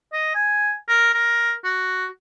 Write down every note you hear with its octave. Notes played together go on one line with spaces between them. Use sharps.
D#5
G#5
A#4
A#4
F#4